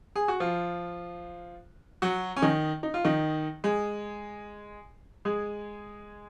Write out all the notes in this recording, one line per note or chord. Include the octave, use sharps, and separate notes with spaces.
G#4
F#4
F3 F4
F#3 F#4
C#4
D#3 D#4
D#4
F4
D#3 D#4
G#3 G#4
G#3 G#4